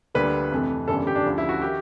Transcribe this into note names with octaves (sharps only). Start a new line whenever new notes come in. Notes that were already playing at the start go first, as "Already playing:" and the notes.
D2 D3 G3 A#3 B4
F2 C3 E3 A3
G1 F#2 C#3 E3 G3 A4
G4
D4
D2 C#3 F3
E4
F#4
D#3 G4